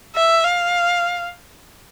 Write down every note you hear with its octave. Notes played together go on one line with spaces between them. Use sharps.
E5
F5